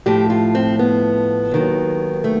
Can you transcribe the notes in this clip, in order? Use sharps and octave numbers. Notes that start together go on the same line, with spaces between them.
A2 F3 G4
F4
C4
B3
D#2 D#3 F#3
A3